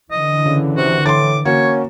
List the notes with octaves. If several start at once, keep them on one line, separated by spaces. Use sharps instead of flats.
D3 E3 D#5
C#3
C3 F#4
A2 C6 D6 A6
A#3 C#4 F#4 C#5